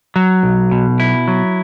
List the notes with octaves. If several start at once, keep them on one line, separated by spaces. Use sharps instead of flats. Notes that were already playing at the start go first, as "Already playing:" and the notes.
F#3
B1
B2
E4
F#3